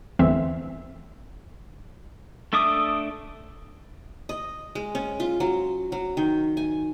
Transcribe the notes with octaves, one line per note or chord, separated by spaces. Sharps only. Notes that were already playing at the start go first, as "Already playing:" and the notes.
G1 E2 E3 A3 C4 E5
A3 D4 E5 D6 D#6
D#5
G#3
C#4
F4
F#3
F#3
D#3
G#5